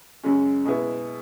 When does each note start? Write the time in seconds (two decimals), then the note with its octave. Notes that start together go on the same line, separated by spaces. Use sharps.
0.23 F#2 C#3 G#3 C#4
0.65 B2 G#3 B3 E4